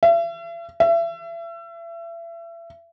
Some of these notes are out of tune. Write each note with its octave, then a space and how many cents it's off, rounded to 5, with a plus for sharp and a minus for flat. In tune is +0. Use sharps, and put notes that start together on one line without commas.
E5 +45
E5 +35